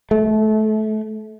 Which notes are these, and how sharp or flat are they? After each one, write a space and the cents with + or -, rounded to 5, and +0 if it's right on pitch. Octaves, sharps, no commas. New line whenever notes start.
A3 -25